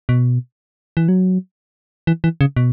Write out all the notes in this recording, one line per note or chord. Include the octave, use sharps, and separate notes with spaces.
B2
E3
F#3
E3
E3
C#3
B2